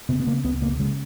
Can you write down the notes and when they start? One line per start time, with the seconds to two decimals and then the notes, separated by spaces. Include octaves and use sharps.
0.09 C#3 B3
0.20 B3
0.27 C#3 A#3
0.44 C#2 B3
0.62 C#3 A#3
0.79 C#3 G#3